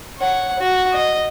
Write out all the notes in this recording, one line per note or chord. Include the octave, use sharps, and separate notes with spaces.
C#5 F#5
F#4
D#5